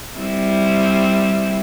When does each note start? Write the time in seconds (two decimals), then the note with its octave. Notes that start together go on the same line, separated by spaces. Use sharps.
0.17 G3 C4 E4